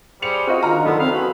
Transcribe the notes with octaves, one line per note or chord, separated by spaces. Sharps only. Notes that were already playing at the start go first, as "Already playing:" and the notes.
G3 G#4 C5 C#7 F7
C4 F4 F#4 D#5
D3 D#3 F4 A#5 F6
F#1 B3 A4
C4 F5
F#4 G#4 A4 B4